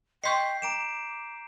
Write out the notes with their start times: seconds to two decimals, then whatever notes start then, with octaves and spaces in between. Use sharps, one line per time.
0.24 D#5 G5 C6 C#6 G6 B6 C7
0.62 A#5 D6 D7 E7